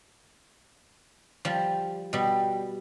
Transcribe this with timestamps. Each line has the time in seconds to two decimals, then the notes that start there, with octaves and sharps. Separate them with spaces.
1.45 F3 G3
2.13 B2 G3